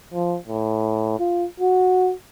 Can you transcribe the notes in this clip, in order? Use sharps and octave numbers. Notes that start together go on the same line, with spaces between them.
F3
A2
F4
F#4